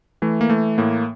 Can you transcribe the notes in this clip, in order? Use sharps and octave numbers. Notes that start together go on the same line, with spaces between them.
E3 A3
A#3
E3 A3
A2 A#3